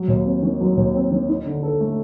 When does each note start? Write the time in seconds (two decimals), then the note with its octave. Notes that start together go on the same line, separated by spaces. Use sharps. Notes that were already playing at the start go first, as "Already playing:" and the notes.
Already playing: F#3
0.08 D#2
0.25 C4
0.43 D#3
0.60 F#3
0.77 D#2
0.95 C4
1.11 D#3
1.28 D#4
1.46 D3
1.63 A4
1.81 A3